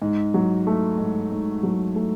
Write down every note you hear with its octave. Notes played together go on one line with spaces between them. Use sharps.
G#2
F#3
A3
G#2
G#2
F#3
A3